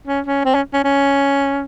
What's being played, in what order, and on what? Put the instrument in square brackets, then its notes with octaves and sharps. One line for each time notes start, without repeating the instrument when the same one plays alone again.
[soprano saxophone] C#4
C#4
C4
C#4
C#4
C#4